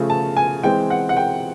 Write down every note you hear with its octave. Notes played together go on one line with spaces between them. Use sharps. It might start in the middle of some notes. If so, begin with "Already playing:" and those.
Already playing: C#3 F3 A3
A5
G#5
E3 G#3 C4 G5
F#5
F#5
G5